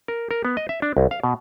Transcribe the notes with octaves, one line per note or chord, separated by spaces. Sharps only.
A#4
A#4
B3
D#5
E5
D4
C2
F5
B2